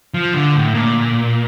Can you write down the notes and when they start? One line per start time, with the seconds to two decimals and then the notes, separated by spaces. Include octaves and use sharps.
0.14 F3
0.34 D3
0.54 A2
0.74 A#2